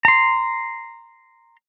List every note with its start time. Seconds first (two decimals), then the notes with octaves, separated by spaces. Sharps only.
0.05 A#5 C6